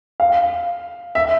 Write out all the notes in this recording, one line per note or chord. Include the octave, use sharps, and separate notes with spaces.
F5
E5